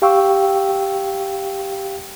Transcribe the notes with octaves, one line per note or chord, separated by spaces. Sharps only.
G4 F5 G5 C#6 E6